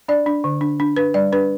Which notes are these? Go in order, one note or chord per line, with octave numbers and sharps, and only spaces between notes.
D4 D5
D4
D3
D4
D4
D4 B4
G3 D5
D4 B4